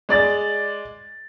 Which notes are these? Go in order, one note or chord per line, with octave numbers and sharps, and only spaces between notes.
G#3 D5 A6